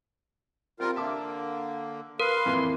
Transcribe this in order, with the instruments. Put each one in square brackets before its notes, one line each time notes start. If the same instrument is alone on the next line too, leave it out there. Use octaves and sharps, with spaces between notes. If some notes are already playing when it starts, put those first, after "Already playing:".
[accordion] G3 F4 A#4 [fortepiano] C4
[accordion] D3 A#3 [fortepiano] E5 A5 D6
[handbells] A#4 [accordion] B4 F5 [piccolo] C6
[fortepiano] F2 E3 A#3